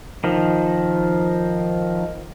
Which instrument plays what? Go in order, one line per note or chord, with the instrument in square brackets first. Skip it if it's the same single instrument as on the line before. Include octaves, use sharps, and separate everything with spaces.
[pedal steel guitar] D#3 F3